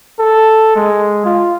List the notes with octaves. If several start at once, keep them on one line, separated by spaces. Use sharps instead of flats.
A4
G#3
F4